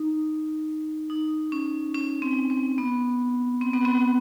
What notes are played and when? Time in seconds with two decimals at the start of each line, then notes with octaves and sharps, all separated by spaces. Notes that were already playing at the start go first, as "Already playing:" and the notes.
Already playing: D#4
1.10 D#4
1.52 C#4
1.95 C#4
2.22 C4
2.50 C4
2.78 B3
3.61 C4
3.74 B3
3.85 C4